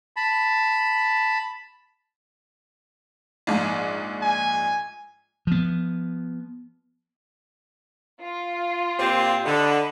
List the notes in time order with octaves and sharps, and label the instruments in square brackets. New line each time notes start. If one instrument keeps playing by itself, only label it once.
[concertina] A5 B5
[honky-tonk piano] A#1 G#2
[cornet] G#5
[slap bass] F3 B3
[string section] F4
[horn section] A#2 C4 G4
[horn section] D3 [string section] D#5 A5 B5